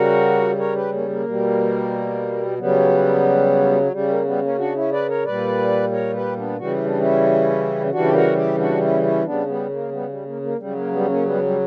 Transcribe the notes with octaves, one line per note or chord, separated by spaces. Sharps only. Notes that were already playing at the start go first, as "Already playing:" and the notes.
Already playing: C#3 G3 F#4 A#4
A#4 C#5
G4 B4
A#3 C#4
A#3
B2 G3
C#3 F#3 G3 B3
C#3 G3
A#3
G3 B3
A#3 C#4
D4 F#4
C#4 E4
B4 D5
A#4 C#5
A#2 G3 B4 D5
A#4 C#5
G4 B4
B3 D4
C#3 E3 G3 F#4
E4
D4
C#4 E4
C#3 E3 G3 D4 F#4
G4
F#4 A#4
E4 G4
D4 F#4
C#4 E4
C#4 E4
C#3 G3 B3 D4
G3 B3
A#3
G3 B3
G3
A#3
A#3
C#3 F#3 G3
A#3
G3 B3
A#3 C#4
G3 B3
G3